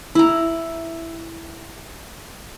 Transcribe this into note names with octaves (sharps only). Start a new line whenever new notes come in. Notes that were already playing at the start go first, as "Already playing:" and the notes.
E4 A#5